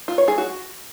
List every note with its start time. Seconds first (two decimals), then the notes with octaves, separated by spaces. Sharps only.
0.08 F4
0.18 C#5
0.28 G#4
0.38 F#4